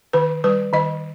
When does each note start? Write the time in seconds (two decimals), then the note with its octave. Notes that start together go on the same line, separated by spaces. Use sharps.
0.13 D#3 B4
0.44 G3 B4
0.73 D#3 D#5